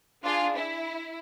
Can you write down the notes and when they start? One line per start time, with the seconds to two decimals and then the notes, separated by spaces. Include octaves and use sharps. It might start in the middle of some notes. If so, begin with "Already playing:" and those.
0.24 D4 F4 G#4
0.57 E4